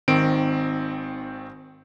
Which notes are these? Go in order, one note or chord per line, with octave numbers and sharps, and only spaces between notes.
G#1 D#3 C4 D7